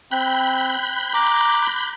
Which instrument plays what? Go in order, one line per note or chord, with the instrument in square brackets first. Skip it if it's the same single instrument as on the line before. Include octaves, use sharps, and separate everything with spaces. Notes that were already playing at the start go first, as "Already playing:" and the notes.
[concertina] C4 [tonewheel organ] B5 F#6 G6
[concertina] A#5 D6